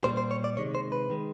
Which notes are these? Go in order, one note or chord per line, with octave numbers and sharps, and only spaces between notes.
A#2 G3 A#3 C5
C5
C#5
D5
C3 D#3 G#3 C#5
C5
B4
D#3 G#3